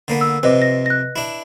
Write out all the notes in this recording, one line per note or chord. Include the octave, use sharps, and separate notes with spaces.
D3 A#3 B3
E6
F2 C3 B4 D#5 D6
A#6
F#6 A#6
D4 E4